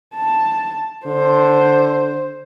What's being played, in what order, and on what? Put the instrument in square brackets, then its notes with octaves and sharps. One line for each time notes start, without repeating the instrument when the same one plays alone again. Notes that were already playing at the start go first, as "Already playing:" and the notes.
[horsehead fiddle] A5
[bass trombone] D3 [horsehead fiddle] C5